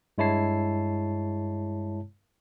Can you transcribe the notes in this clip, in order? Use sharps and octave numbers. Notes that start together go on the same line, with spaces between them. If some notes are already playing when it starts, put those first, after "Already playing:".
G2 G#3 E4 C#5 A5 C7